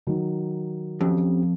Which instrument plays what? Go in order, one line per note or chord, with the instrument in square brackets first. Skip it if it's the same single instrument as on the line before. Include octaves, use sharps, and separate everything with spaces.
[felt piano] D#3 F#3
[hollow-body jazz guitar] F2 [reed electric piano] C4 C#4 G4